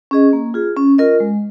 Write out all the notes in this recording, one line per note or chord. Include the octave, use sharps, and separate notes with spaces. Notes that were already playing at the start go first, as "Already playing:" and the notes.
C#4 G#4 D#5
A#3
F4 G#4
C#4
F4 A#4 D#5
G#3